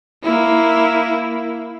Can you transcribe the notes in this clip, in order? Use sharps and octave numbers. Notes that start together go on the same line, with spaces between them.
A#3 E4